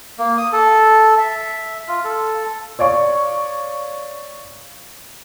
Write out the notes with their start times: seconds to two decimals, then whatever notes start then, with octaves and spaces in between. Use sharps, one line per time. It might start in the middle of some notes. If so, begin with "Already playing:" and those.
0.18 A#3
0.38 D#6
0.53 A4
1.18 E5
1.88 F4
2.04 A4
2.79 C#5 D5 F5 C#6